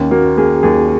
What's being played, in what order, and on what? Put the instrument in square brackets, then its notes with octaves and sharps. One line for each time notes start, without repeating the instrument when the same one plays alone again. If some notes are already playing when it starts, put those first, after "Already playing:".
Already playing: [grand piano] D#2 [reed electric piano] C#4
[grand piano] A#3 [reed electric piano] F#4
[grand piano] A#3 [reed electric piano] G#4
[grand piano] D#2 [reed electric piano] G#4